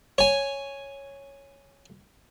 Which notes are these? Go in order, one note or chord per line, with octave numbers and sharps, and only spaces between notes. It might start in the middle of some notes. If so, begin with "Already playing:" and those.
C#5 G#5